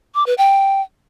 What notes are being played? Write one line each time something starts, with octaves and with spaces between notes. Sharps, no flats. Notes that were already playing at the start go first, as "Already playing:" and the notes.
D6
B4
G5